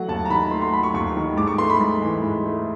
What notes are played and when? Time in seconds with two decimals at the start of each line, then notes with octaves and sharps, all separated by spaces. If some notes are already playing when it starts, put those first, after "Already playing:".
Already playing: F#3 A3 F#5
0.08 D#2 A5
0.25 A#5
0.30 D#3 B5
0.51 A3 C6
0.62 C6
0.74 F#3 B5
0.83 C#6
0.94 D#2 C#6
1.16 D#3
1.37 G#2 D6
1.47 C#6
1.58 A3 C6
1.70 B5
1.80 G#2
2.02 E3
2.23 G#2
2.45 A3